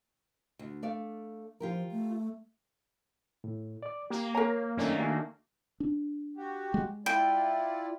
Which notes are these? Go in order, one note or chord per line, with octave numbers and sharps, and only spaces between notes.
D2
A3 D5 F5
F3 F4 G4 A#4
A3
A2
D5 D6
A#3 G4
A#4 C#5 A#5
F#2 D#3 A3 A#3 C#4 D4
D4 F#4 G#5
D4
F#4 G4
G#3
E4 F4 D5 G5